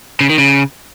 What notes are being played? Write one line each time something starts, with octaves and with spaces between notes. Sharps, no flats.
C#3
D#3
C#3